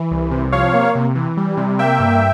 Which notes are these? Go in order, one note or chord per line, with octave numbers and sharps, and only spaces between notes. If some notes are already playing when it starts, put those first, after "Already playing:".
Already playing: E3
C2
C3
F3 C#5 F5
A#3
C3
E3
G3
C3
A#3 E5 G5
G2